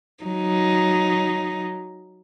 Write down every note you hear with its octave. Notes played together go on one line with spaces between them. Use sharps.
F#3 D#4